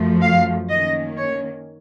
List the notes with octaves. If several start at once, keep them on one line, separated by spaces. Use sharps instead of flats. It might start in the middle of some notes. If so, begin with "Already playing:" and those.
Already playing: F#2 F3 A3
F5
D#3 A#3 C#4 D#5
C#5